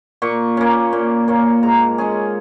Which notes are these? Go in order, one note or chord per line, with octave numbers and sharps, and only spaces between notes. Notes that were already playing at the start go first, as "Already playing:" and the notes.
A#2 C#6
A#3 C#4
A#2
A#3 C#4
G#2 A#5
G#3 C#4 G#4